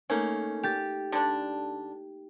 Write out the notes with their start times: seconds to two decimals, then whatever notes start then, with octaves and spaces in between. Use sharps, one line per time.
0.10 A3 A#3 C#4 D#4
0.63 G4 A6
1.12 D3 D4